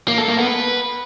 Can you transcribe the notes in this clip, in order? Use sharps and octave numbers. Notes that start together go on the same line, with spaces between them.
A#3
A4
A#3
B3
B4